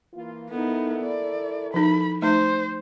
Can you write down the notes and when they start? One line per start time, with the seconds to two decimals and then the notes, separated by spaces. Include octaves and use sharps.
0.14 E3 A#3 F4
0.51 B3 D#4 E4 A4 A#4
1.02 D5
1.74 F3 D#4 B5
2.22 A3 D#4 C5 E5